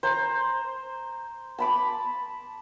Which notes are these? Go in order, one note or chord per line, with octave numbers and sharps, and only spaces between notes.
C5 A#5
A5 B5 D6